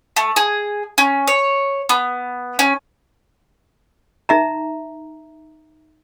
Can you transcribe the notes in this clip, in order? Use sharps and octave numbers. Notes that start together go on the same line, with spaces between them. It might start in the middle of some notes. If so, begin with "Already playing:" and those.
A3
G#4
C#4
C#5
B3
C#4
D#4 E5 A#5